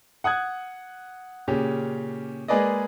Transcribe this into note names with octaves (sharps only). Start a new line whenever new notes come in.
F#5 D#6 F#6 G#6
A#2 C#3 C#4 G4
G#3 A#3 G#4 B4 D5 D#5